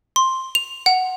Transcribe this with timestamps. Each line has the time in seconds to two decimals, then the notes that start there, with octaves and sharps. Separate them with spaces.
0.16 C6
0.55 F7
0.86 F#5